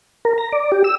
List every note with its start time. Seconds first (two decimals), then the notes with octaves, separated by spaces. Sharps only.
0.25 A#4
0.38 A#5
0.52 D5
0.72 G4
0.84 E6